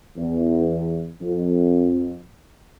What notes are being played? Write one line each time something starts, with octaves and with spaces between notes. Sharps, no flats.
E2
F2